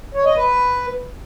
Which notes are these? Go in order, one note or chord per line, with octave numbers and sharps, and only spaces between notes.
C#5
D#5
B4